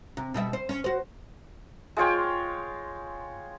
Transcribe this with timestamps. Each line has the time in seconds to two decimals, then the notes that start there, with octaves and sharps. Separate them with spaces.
0.17 C3
0.34 B2 G3 E5
0.53 C5
0.69 C#4
0.84 F#4 C5
1.97 G#3 F4 C#5 G5